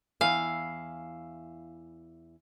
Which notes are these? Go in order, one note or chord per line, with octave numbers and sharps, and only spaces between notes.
E2 E4 F5 G#5